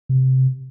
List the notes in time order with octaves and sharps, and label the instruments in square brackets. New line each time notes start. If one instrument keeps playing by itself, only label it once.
[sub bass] C3